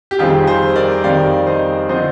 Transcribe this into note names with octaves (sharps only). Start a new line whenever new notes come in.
G4
F2 D#3 G3 C4 F4 G#4
G#4 C5
A#4 D5
F2 D#3 G3 C4 D5 F5
C5 D#5
D3 F3 C4 C5 D#5